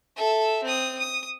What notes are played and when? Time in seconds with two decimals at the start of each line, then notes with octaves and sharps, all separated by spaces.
0.16 A4 E5
0.63 C4 D#6
0.99 D#6